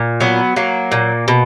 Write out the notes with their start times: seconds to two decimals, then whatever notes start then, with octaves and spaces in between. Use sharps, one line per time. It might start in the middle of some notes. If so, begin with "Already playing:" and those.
Already playing: A#2
0.20 F#3 B3
0.56 F#3 A#3
0.92 A#2
1.28 B2